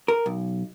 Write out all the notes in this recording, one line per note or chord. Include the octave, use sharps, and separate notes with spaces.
A#4
B1